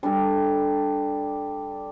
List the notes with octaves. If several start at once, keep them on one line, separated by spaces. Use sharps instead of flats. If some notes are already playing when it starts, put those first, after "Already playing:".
G3 D4 A4